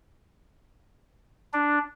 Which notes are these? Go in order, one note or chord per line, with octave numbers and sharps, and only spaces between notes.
D4